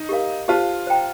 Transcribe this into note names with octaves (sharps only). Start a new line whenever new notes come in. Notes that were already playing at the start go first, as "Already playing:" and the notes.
Already playing: D#4
G4 A#4 F5
F4 G4 C5 F5 A5
C5 G5 A#5